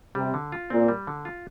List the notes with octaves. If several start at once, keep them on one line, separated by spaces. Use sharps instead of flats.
C3 G3
D3
F4
A#2 C4
G3
D3
F4